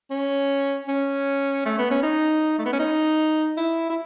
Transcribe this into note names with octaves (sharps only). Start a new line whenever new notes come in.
C#4
C#4
A3
B3
C#4
D#4
A3
B3
C#4
D#4
E4
E4